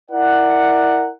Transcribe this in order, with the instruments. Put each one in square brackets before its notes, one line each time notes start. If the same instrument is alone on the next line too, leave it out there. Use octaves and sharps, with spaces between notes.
[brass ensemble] E4 A#4 D5 F#5